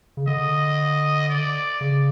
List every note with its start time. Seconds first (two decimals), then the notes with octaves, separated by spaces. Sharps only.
0.17 C#3
0.27 D3 D#5
1.29 D5
1.81 C#3